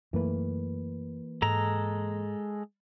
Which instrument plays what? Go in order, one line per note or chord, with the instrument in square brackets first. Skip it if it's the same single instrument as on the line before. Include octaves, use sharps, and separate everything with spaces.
[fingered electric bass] F#2 A3 [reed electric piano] E3 A#3 B4
[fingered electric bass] G#2 [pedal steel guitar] G#3 A4 A#5